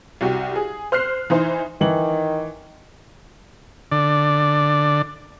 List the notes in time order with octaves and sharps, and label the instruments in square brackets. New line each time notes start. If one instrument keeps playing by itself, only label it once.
[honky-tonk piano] C2 F#4 G4
G#4
C5 F6 F#6 C7
E3 D#4 C5
[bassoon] D#3 [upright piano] E3 F#7
[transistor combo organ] D3 D5